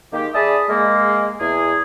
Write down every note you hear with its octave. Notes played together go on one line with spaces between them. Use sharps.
D#3 G#3 A#3 G4
G#4 D5 E5 A5 B5 D#6
G#3 A#3
E2 G#4